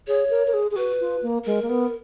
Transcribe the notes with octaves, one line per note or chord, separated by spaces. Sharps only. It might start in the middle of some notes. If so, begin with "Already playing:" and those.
G#4 C#5
A#4
A#4
G#4
G#4
F#4 B4
F4
A#3
G#3 A#4
A#3
B3